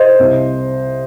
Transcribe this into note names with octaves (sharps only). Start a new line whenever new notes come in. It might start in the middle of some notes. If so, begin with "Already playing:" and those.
Already playing: C5 D#5
C2